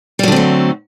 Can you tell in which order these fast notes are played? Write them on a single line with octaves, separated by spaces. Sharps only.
G3 F#3 D3 C4 A3